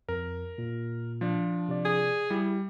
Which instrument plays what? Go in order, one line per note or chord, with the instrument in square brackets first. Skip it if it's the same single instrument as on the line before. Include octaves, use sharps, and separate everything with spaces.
[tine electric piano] F2 [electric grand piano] A#4
[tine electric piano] A#2
[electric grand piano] F3 D4
[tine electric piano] C3 D5
[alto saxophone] G#4
[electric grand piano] G3 [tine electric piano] E4